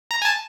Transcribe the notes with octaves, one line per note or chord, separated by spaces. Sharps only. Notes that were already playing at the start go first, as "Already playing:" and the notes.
A#5
G#5
A5